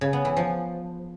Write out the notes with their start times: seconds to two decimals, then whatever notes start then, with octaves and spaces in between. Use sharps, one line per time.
0.01 C#3
0.13 B3
0.25 E3
0.37 F3